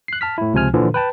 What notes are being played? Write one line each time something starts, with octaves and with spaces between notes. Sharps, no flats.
F#6 C7
A5 F6 B6
A2 E4
C#2 C3 F3 G#5 F6
A#2 D3 E3 F3
B4 G5 A5